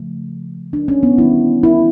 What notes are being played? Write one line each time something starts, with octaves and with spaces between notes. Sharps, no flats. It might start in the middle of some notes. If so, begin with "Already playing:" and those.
Already playing: C#3 F3 A3
D4
C#4
B3
D#3 G3 A#3 E4
E4